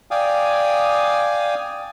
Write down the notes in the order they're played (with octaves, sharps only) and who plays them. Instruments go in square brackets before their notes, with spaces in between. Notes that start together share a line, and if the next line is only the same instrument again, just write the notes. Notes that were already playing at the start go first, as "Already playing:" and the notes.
[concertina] D5 F5 G5 G#5 D#6